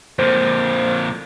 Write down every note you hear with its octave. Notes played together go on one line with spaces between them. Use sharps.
F2 A#2 C5